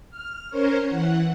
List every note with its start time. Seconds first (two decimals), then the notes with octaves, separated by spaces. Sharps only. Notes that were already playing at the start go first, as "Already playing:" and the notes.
0.10 F6
0.50 C#4 A#4 C5 C#5
0.87 E3 F#5